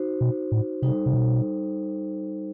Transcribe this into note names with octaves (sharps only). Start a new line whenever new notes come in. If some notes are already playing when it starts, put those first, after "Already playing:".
Already playing: D#4 F#4 C5
B2
A2
C3 G3 D#4 A4 C5
C3
B2